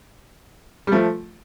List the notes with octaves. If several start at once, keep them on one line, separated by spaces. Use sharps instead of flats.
G3
F3 A3